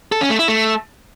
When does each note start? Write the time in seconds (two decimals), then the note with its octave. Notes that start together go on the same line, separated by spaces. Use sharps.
0.12 A4
0.21 C#4
0.30 A3
0.39 E4
0.48 A3